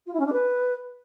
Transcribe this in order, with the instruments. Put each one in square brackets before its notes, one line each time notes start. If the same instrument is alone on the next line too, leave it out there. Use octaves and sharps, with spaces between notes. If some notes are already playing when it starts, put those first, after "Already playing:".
[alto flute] F4
E4
C#4
D4
B4